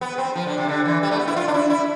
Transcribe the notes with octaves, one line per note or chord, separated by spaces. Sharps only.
B3
C4
F3
D3
C3
D3
E3
G3
A3
B3
E4
F4
D4
E4
E4